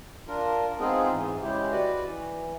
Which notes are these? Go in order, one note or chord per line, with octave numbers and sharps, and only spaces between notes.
D4 F4 A#4
G#3 B3 C4 D#4 F4 G#4
G#2 E3
C#3 G#3 E4 G4
F#4 B4 D5
E3